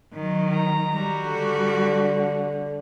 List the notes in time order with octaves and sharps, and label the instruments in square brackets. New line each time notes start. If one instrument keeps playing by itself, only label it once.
[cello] D#3 F#3
[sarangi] A#5
[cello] G3 F#4
[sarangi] D3